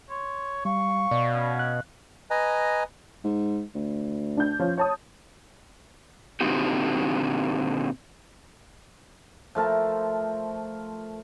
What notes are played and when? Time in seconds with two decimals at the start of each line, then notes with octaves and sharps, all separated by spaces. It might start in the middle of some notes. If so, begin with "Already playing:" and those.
0.10 C#5 C6
0.65 G3 F5 C#6
1.11 B2 D5
1.34 C#4
1.59 F#6
2.30 B4 D#5 G#5 A#5
3.24 G#2
3.75 D2
4.37 D4 G6
4.59 F3 C#4 F4
4.78 C#5 A5 D#6
6.41 A#2 D3 C4 D#4 F#4 G4
9.55 F3 A3 A#4 A5